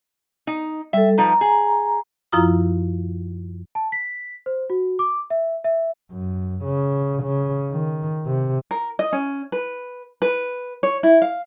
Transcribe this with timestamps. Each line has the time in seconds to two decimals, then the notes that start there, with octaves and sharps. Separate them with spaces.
0.47 D#4
0.93 G3 A4 E5
1.18 F3 D#4 B4 A#5
1.41 G#4
2.32 F#2 F3 E4 F4 A#5 D#6
3.75 A5
3.92 B6
4.46 C5
4.70 F#4
4.99 D6
5.30 E5
5.64 E5
6.12 F#2
6.64 C#3
7.23 C#3
7.72 D#3
8.26 C3
8.71 A#4
8.99 D#5
9.13 C#4
9.52 B4
10.22 B4
10.83 C#5
11.03 E4
11.22 F5